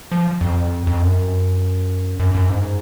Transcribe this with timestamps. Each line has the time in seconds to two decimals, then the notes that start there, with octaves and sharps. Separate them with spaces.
0.12 F3
0.41 F2
0.87 F2
1.02 F#2
2.20 F#2
2.35 F#2
2.49 G#2